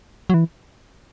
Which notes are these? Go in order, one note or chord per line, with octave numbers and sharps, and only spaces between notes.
F#3
E3